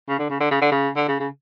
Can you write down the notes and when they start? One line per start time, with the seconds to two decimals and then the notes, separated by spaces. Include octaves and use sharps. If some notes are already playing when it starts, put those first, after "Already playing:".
0.09 C#3
0.19 D3
0.30 C#3
0.40 D3
0.51 C#3
0.61 D3
0.71 C#3
0.96 D3
1.08 C#3
1.20 C#3